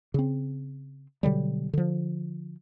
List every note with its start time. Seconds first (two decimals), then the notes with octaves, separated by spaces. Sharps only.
0.14 C#3 C4
1.23 B2 D3 F#3 G3
1.73 D3 F3